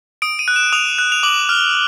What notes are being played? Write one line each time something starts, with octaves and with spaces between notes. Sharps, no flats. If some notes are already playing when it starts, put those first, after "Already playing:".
D#6 D7
D#7
F#6
E7
D#6 F7
F#6
F7
D6 F#7
F6